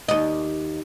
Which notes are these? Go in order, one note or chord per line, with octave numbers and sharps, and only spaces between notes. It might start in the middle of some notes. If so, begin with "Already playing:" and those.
D#2 D#5